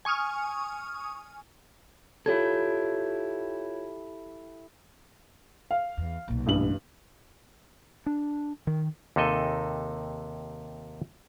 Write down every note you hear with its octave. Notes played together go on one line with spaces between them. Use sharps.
G#5 C#6 D#6 F6
E4 F4 G4 A4 C#5 G#6
F5
E2
B1 A#2
A1 G2 F#7
D4
D#3
D#2 C3 D#4 A4 D#5 G#5